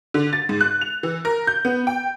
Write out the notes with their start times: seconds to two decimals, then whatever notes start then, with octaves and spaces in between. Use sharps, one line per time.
0.14 D3
0.33 A6
0.49 G#2
0.61 F#6
0.81 F7
1.03 E3
1.25 A#4
1.47 G6
1.65 B3
1.87 G5